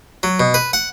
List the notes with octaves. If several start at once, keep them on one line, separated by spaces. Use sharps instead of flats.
F#3
B2
B4
F#5